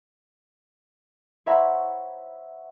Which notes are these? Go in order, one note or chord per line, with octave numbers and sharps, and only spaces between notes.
C5 C#5 E5 F#5 A#5 B5